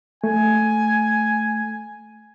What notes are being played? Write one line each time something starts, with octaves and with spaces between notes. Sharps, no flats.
A3 G#5